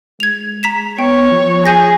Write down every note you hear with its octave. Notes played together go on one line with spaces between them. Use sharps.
G#3 G#6 F7
A#5 B6 E7
B3 C#5 G5
F3
G#4 G#5 G6 A#6